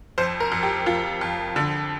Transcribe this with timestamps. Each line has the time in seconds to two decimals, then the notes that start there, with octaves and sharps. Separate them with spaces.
0.18 F2 C5
0.40 A#4
0.52 F2
0.63 G4
0.86 F2 F4
1.21 F2
1.56 D3